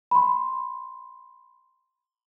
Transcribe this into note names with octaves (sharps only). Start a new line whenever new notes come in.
B5 C6